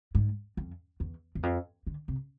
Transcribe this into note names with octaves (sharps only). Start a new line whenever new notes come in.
G#2
F2
E2
E2
F2
D3
C3